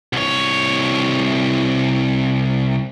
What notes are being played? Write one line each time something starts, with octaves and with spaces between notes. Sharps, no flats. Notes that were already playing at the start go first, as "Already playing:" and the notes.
C2 C#5